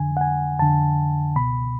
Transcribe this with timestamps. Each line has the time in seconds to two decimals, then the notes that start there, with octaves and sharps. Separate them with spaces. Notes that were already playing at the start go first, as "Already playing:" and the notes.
Already playing: F2 D3 G#5
0.17 F#5
0.21 G#5
0.59 F2 D3 A5
1.36 C#2 B2 B5